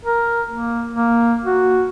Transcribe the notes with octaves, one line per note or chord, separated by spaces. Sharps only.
A#4
A#3
A#3
F#4